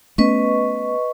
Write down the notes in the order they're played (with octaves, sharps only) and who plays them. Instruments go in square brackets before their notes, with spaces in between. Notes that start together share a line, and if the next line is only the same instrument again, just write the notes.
[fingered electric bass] A3 B3 C#4 [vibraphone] B4 D#5 C#6